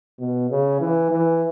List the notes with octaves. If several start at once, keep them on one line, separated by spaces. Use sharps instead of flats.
B2
C#3
E3
E3